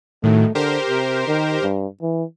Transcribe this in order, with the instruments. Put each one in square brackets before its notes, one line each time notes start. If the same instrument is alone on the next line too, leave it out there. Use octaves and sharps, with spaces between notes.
[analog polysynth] A2 D#3 F#3 [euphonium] A3
[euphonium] D3 [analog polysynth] G4 A#4 C5
[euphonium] C3
D#3
G2
E3